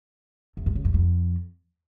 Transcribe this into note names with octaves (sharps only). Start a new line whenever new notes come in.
E2
G2
C#3
F#2
F2